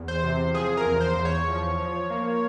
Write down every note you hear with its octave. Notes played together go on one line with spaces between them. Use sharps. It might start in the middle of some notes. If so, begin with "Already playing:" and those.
Already playing: E2
C5
C3
F3 G#4
A#4
E2
C5
E2
C#5
F3
F3
A#3